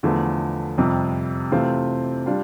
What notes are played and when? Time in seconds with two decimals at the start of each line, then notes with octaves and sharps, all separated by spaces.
0.03 E2 D3 F3 A3
0.78 F2 C3 G3
1.52 C3 E3 A3 C4 F4
2.26 G3 D4 F4